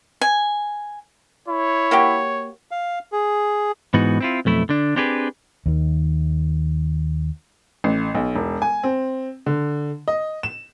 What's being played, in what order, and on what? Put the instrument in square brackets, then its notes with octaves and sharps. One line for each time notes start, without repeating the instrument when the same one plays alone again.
[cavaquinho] G#5
[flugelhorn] E4 [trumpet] C#5
[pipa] A#3 F#4 G4
[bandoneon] F5
G#4
[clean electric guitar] G#2 E3 B3 D#4 F#4
C4 E4 F4
B1 F2 A3 E4
D3 D4
C4 D4 G4 G#4 B4
[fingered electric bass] D#2 D#3
[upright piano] A1
B1
E1
G#5
C4
D3
D#5
E7